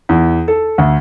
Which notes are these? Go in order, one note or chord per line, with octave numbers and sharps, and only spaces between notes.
E2
A4
D2